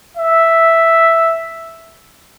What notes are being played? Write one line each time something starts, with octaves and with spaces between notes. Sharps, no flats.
E5